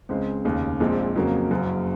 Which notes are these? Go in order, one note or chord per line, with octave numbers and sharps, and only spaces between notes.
C#2 C#3 G#3 C4
F1 D#2 C#3
A#1 A#2 G#3 C4
F2 C#3 F#3 A#3
F#1 F#2 C#3